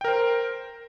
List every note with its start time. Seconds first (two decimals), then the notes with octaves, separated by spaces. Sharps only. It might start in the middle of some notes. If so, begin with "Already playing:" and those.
0.01 G5
0.04 A#4
0.08 C5